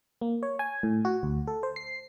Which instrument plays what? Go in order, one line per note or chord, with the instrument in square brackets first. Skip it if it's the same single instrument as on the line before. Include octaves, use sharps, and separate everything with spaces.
[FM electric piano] A#3
C#5
G#5
A2
F#4
D2
A4
C5
C7